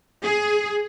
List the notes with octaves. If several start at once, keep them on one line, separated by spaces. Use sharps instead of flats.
G#4